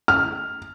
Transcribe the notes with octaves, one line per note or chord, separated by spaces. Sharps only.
F6